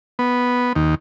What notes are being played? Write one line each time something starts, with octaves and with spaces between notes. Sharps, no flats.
B3
D#2